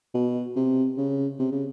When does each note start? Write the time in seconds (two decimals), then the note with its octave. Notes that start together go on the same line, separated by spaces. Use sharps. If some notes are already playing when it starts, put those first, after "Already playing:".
0.14 B2
0.56 C3
0.97 C#3
1.39 C3
1.52 C#3